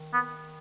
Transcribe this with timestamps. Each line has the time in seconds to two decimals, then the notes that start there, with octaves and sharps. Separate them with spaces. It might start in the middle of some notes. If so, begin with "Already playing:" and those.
Already playing: D#3
0.13 B3